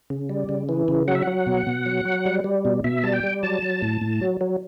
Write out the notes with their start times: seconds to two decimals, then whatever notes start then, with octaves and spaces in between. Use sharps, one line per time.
0.10 C#3
0.29 G3
0.49 C#3
0.69 E3
0.88 C#3
1.08 F#3 F#5
1.15 E5
1.22 F#3 F#5
1.47 B2
1.67 B2
1.86 F#3
2.05 F#3
2.26 G3
2.44 G3
2.65 B2
2.84 B2 E5
3.03 G3 A5
3.13 G5
3.23 G3
3.43 F#3 A5
3.62 F#3
3.82 A2
4.01 A2
4.21 F#3
4.41 F#3